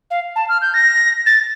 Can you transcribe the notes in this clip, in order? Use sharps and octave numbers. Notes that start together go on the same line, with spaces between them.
F5
A5
F6
G6
A#6
A6